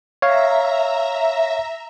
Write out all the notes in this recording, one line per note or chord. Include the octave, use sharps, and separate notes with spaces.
C#5 E5 F5 A#5